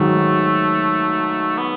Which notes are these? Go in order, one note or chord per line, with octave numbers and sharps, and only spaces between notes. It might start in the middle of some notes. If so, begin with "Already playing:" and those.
Already playing: G#2 D#3 F#3 A3
B3